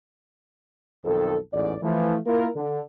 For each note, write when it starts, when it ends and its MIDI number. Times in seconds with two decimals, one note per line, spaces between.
1.05 1.36 35
1.05 1.36 41
1.05 1.36 51
1.05 1.36 69
1.53 1.75 33
1.53 1.75 40
1.53 1.75 44
1.53 1.75 74
1.83 2.16 52
1.83 2.16 53
1.83 2.16 57
2.26 2.47 58
2.26 2.47 64
2.26 2.47 65
2.26 2.47 70
2.55 2.81 50